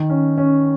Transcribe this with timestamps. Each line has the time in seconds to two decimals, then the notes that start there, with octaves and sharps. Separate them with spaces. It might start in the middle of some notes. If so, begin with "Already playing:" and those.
Already playing: D#3
0.10 C#4
0.38 C#4